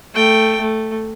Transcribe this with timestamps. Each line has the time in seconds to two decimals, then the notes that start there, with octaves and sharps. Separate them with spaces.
0.14 A3 G5
0.61 A3